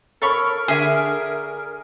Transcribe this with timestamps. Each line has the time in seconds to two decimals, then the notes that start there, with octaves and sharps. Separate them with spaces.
0.22 A4 A#4 C#5 B5
0.68 D3 G#4 E5 G#5